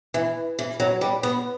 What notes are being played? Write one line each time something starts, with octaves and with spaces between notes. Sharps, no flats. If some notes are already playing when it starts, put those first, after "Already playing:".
E3
E3
F#3
G3
B3